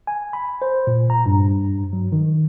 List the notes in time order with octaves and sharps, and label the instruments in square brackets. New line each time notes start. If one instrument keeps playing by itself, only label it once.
[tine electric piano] G#5
B5
C5
A#2
A#5
G2
F#3
D#3